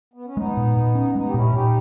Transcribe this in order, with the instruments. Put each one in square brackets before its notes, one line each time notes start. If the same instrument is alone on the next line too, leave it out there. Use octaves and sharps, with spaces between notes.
[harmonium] B3
C#4
[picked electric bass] G#3 [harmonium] B3 D#4
[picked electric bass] A#2
A#2
C#4
[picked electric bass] G#3 [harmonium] B3 D#4
[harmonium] G4
[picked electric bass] A#2 [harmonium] C#4 E4
[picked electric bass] A#2 [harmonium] D#4 G4